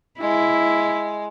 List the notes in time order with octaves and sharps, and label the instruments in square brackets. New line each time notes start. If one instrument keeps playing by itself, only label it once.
[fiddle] G#3 [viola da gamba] E4